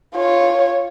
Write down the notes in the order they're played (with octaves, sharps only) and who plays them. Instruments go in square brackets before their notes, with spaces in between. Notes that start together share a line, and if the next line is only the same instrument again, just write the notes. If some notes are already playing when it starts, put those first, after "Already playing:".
[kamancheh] F4 C#5